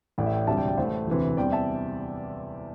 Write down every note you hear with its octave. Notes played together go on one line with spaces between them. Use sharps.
A1 A2 A3 D5 G5
E5
D5 G5
E1 D2 C3 G3 E5 A5
D5 G5
D5 G5
A1 A2 A3 C5 E5
E1 D2 C3 E3
E2 C3 G3 D5 G5
E5 A5